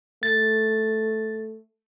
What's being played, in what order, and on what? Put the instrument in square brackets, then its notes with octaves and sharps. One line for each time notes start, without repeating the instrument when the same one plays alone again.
[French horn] A3 [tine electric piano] A6